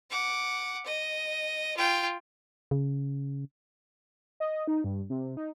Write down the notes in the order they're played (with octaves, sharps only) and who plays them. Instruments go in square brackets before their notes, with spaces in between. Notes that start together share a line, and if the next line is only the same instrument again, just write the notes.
[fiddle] F#5 D6
D#5
F4 G5
[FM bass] C#3
[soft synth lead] D#5
D#4
G2
C3
D#4